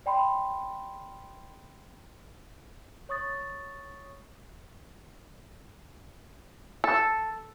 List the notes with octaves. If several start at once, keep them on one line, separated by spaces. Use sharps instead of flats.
D5 G5 B5 C6
C#5 C#6 D#6 A6
A4